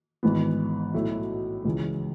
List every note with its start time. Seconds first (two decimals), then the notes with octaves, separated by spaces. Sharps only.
0.23 G#1 G#2 E3 B3
0.94 B1 A2 F#3 A3 E4
1.65 C#2 C#3 E3